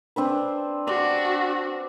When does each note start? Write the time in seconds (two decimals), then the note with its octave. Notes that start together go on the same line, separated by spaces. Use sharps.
0.16 C4 D4 B4
0.87 D4 F#4 D5